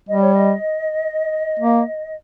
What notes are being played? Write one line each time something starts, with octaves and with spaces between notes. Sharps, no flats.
G3 D#5
C#5
D#5
A#3